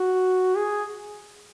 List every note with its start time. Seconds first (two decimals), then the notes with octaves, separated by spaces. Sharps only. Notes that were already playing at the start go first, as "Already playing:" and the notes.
Already playing: F#4
0.56 G#4